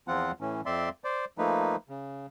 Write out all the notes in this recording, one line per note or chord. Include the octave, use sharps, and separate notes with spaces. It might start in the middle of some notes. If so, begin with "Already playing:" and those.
E2 F3 C4 F4 F#5
A2 E3 C#4
F2 C4 D5 E5 C6
C5 D5
F3 A3 A#3 D#4 B4
C#3